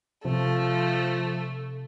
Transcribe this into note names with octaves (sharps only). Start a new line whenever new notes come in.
C3 F3 A3